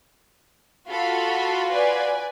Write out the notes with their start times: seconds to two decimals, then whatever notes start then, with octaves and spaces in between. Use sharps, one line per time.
0.90 F4 F#4 A4 B5
1.71 B4 D5 G#5